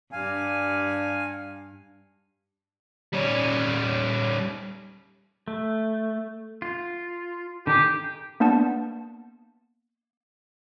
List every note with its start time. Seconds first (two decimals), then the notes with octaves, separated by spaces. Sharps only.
0.12 G2 F5 G#5
3.13 G3 C#4
5.48 A3
6.62 F4
7.67 D3 D#3 G4 G#4
8.40 A#3 B3 D4 F#5 A5